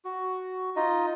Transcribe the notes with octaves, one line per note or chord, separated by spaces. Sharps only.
F#4
D#4 F4 D#5